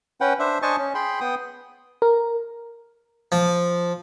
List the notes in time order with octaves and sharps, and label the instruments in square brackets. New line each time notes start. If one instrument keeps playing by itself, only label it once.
[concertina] C#4 B4 F#5 G5
D4 C5 E5
D4 C5 D#5 G#5 A5 C#6
C#4
G#4 G5 B5 C6
B3 G5 D#6
[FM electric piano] A#4
[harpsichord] F3